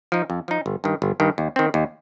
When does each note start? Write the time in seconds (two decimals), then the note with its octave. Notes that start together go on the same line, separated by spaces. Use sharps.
0.12 F3 D#4
0.30 F2
0.48 F3 D#4
0.66 G1
0.84 G2 D#3
1.02 G1
1.20 G2 D#3
1.38 D#2
1.56 D#3 C4
1.74 D#2